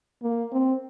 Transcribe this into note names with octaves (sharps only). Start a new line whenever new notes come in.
A#3
C4